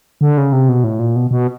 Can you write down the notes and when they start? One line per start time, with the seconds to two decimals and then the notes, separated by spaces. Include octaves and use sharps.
0.21 D3
0.38 C#3
0.52 C3
0.69 B2
0.84 A2
0.99 A#2
1.16 B2
1.31 B2